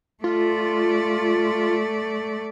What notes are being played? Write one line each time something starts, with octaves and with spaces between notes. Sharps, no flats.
A3 F4 D5